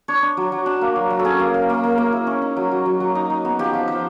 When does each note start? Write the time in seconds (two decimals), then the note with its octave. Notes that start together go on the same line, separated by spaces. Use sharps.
0.08 D4 C#5
0.22 D4
0.37 F#3
0.52 F#3
0.66 D4
0.81 A#3
0.96 F#3
1.10 F#3
1.19 A4
1.25 C#4 G#4
1.40 A#3
1.54 A#3
1.69 A#3
1.84 A#3
1.98 A#3
2.13 E4
2.27 C#4
2.42 D#4
2.57 F#3
2.72 F#3
2.86 F#3
3.00 F#3
3.15 D#4
3.30 D#4
3.45 B3
3.59 F3 G4
3.73 F3
3.88 F3